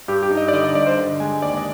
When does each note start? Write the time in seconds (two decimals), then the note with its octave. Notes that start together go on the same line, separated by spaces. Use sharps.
0.08 G2 G4
0.23 G4
0.31 D#4
0.37 D#5
0.48 D5
0.53 D3 D#5
0.64 D#5
0.75 G2 D5
0.87 C5
0.98 D3
1.20 G#3 G#5
1.42 D#2 D5
1.57 D#5